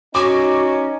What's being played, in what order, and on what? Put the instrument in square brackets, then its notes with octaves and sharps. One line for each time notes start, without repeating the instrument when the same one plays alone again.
[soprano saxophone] C#4 [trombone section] D#4 [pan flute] F#4 [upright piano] D6